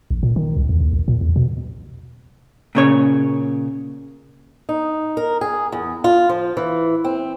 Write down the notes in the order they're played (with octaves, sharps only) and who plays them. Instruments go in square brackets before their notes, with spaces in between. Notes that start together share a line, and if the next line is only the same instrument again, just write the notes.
[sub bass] A#1
A#2
D#3
C2
E2
D#2
B1
A#2
E2
B2
[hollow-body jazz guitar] A#2 C#3 C#5
[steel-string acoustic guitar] D#4
A#4
G#4
E2
F4
F3
E3
C4